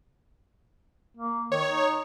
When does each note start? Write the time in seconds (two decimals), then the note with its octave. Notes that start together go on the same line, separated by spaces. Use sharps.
1.17 A#3
1.52 D#3 C#5
1.70 D#4